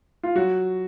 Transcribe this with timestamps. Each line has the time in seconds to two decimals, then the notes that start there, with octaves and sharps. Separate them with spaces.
0.23 F4
0.35 F#3 F#4